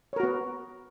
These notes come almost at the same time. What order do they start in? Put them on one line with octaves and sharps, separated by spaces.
C#5 A#4 F#4 B3